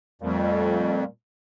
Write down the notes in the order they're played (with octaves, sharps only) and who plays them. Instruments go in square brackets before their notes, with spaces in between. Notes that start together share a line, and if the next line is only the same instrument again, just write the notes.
[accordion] F2 [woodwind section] A#2 G3 A3